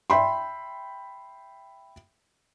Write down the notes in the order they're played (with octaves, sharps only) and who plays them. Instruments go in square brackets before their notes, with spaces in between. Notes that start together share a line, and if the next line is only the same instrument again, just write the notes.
[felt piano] E5 G5 B5 C6